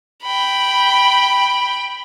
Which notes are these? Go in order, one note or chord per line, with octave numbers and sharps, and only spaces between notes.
G5 B5